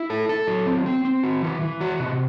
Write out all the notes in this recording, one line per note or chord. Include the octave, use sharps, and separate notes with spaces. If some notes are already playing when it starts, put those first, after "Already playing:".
Already playing: E4
A4
A4
F#3
C4
C4
C4
F#4
E3
E3
F#4
C3